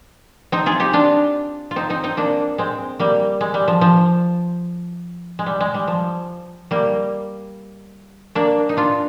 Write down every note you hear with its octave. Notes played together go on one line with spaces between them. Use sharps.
C4 D#4
F4 G#4
D#4 G4
D4 F4
F4
C4 D#4
C4 D#4
C4 D#4
A#3 D4
G#3 C4
G3 A#3
G#3
G3
F3
F3
G#3
G3
G#3
G3
F3
G3 A#3
A#3 D4
D#4
D4 F4